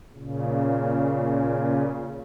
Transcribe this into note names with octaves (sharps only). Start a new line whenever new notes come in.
A#2 C#3